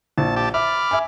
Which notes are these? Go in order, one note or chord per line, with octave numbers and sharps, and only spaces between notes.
A#1 A5
G4 A5
E5 B5 D6 F6
E5 G#5